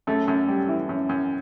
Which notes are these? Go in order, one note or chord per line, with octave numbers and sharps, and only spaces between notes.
F#2 A3 A4
F#2
G3
E3
F#2
F#2